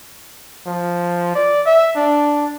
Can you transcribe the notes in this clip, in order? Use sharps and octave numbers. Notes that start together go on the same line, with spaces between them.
F3
D5
E5
D4